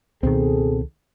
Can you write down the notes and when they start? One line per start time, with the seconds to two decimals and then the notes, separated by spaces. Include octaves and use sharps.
0.23 C#2 B2 D#3 C4 G#4 A4